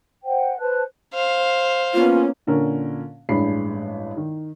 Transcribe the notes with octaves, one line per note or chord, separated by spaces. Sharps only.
C5 F#5 G5
B4 C5 A5 F#6
C5 F5
A#3 B3 C#4 F4
A#2 D3 C#4 A#4
A1 G2 G#3 D4 B5 C7
D#3